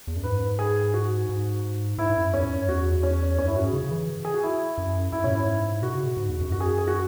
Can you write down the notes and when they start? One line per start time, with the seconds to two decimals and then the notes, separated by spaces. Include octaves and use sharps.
0.07 E2
0.16 F#2
0.23 G#2 B4
0.59 G#4
0.94 F#4
1.29 G#2
1.98 G#2 E4
2.10 G#2
2.16 F#2
2.33 E2 C#4
2.43 G#2
2.50 F#2
2.68 E2 F#4
3.03 C#4
3.38 F#2 C#4
3.47 E4
3.55 G#2 F#4
3.64 G#4
3.73 C#3
3.84 C#3
3.91 E3
4.25 G#4
4.34 F#4
4.43 E4
4.78 F#2
5.12 F#2 E4
5.24 B2 C#4
5.31 G#2 E4
5.82 B2 F#4
5.94 C#3
6.06 B2
6.17 G#2
6.29 E2
6.41 F#2
6.52 F#4
6.60 G#4
6.78 G#4
6.87 F#4